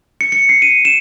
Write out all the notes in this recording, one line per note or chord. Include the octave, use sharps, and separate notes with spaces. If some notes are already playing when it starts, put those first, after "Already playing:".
C#7
C#7
C7
D#7
E7